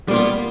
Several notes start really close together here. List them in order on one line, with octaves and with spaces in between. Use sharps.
G3 A#3 F4 B3